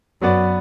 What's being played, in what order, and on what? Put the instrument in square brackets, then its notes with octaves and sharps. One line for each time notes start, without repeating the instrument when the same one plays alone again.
[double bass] F#2 [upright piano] F#3 B3 F#4 B4 D5